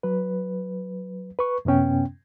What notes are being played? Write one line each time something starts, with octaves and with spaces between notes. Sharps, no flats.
F#3 B4
B4 C#6
F#2 C3 B3 C#4 G5